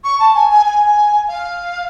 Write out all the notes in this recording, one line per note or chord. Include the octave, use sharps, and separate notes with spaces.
C#6
A5
G#5
G#5
G#5
F5